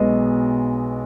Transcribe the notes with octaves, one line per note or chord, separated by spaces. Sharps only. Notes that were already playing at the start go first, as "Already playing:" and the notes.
Already playing: B1 B2 G#3 B3 D#5